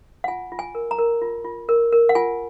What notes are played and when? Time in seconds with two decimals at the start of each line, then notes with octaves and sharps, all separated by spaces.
0.24 F#5
0.28 F4 G#5
0.52 F4
0.59 G#5
0.75 A#4
0.91 A#5
0.99 A#4
1.22 F4
1.44 F4
1.69 A#4
1.92 A#4
2.09 F#5
2.15 F4 G#5